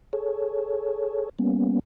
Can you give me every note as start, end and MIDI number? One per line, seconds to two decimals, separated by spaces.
0.13 1.29 68
0.13 1.29 69
0.13 1.29 73
1.39 1.79 55
1.39 1.79 58
1.39 1.79 59
1.39 1.79 61